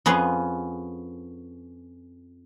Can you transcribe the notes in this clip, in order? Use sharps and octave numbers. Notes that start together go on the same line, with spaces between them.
F2 B3 C#4 G#4 C6